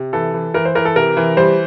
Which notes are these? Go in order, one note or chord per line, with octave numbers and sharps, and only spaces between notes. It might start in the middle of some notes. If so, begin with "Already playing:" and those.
Already playing: C3
E3 A4
E3
E3 A#4
C5
E3 A#4
A4
C3 A#4
E3
G3 C5